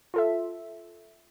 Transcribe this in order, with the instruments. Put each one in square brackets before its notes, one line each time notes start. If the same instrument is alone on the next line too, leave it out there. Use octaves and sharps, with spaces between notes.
[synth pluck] F4 A4 E5